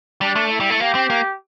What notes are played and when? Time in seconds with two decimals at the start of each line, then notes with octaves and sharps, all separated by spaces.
0.21 G3 D4
0.36 A3
0.51 E4
0.60 G3
0.70 A3
0.80 A#3 G4
0.95 C4
1.10 A#3